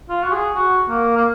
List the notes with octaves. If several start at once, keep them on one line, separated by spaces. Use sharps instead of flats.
F4
F#4
G#4
F#4
A#3
A#3